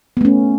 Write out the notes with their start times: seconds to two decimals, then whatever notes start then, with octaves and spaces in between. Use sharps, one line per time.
0.17 B3
0.21 A3
0.25 C#4